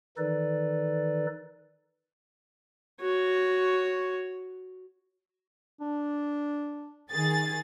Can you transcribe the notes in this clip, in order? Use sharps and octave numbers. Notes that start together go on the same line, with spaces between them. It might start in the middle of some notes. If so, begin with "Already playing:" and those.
D#3 E3 D#4 A4 B4 D5
F#4 C#5
D4
D#3 G#4 A6